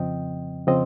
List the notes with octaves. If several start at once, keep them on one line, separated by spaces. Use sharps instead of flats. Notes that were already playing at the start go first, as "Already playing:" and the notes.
Already playing: F2 C#3 F3 C4 D#5 G5
C#3 F3 C4 C5 D#5